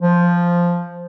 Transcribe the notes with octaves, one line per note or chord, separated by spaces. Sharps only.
F3